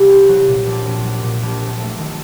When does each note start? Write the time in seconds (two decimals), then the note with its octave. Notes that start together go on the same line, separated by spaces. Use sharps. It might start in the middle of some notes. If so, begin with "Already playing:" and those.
Already playing: C2 C3 G3
0.09 C4
0.29 F#3
0.47 A#2
0.66 A#1
0.85 A#1
1.04 F#3
1.23 A#2
1.43 A#1
1.62 A#1
1.80 A3
1.99 D#3